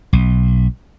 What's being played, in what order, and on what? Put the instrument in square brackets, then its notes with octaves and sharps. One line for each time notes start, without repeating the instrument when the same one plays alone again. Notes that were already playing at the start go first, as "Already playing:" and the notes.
[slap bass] B1